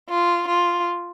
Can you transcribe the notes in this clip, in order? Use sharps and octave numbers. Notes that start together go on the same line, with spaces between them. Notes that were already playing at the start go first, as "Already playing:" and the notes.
F4
F4